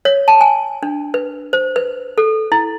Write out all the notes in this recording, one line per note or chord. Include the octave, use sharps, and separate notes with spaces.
C#5
A5
G#5
D4
B4
C5
B4
A4
E4